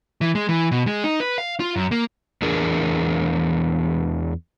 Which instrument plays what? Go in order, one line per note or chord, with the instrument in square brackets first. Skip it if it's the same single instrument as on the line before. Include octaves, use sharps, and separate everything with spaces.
[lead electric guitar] E3
G#3
E3
B2
G#3
D#4
B4
F5
F4
F#2
A#3
[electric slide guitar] E2 E3 D4 G#4 A#4